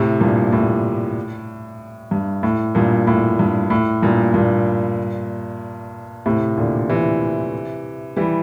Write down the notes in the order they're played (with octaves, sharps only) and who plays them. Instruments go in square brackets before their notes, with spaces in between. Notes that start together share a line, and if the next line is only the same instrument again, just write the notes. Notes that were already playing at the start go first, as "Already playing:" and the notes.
Already playing: [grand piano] A2 C3
G2 A#2
A2
G2
A2
G2 A#2
A2
G2
A2
G2 A#2
G2 A#2
A2 C3
A#2 D3
C3 E3
E3 G3